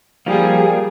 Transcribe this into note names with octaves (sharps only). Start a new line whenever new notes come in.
F3 G3 A#3 G#4